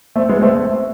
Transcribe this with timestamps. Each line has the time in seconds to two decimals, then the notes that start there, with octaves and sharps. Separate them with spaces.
0.16 A3 C4
0.29 G#3 B3
0.41 A3 C4
0.55 A3 C4